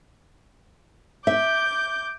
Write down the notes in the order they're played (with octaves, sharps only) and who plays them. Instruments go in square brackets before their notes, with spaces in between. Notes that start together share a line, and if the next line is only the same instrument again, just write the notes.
[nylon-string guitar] E5 [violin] D6 G6